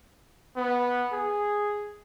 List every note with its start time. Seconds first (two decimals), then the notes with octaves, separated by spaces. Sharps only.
0.56 B3
1.13 G#4